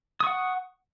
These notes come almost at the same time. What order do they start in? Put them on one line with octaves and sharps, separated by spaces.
D#6 C#6 F#5